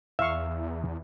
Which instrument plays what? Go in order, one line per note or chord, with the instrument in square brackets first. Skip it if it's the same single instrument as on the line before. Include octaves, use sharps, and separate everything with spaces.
[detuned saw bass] E2 [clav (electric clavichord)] E5 [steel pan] F5 C#6